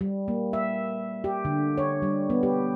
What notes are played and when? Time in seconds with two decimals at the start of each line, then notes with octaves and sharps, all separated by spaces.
0.01 G3
0.28 A#3
0.53 E5
1.24 G4
1.45 D3
1.78 C#5
2.02 G3
2.30 B3
2.43 G4